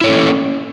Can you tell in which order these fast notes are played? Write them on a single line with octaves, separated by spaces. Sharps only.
E4 C#5 A4 C#4 A#3